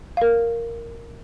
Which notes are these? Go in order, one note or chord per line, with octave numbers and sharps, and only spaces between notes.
A#4 F5